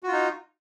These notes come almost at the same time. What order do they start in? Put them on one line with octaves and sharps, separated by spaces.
F#4 F4 D#4